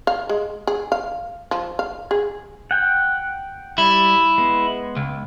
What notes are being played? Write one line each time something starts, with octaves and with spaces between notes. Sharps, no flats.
F5
G#3
G#4
F5
F3
F5
G#4
F#5 G5
G3 E4
G#3 B3
C#2